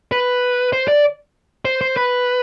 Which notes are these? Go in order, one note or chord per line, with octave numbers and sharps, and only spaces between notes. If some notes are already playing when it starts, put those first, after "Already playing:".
B4
C5
D5
C5
C5
B4